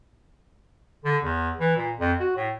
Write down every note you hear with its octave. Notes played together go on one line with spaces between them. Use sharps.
D3
E2
E3
A#2
F2
F#4
A2